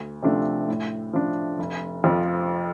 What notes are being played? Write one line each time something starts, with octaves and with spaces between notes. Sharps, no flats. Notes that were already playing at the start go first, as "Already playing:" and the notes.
Already playing: D2
C3 F3 A3 D4
A2
F3 D4
F1
F2 F3